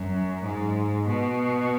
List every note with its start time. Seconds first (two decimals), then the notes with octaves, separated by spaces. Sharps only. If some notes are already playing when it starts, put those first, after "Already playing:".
Already playing: F#2
0.42 G#2
1.07 B2